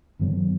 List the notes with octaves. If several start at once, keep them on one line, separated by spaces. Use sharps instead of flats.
G2 D#3 F#3 B3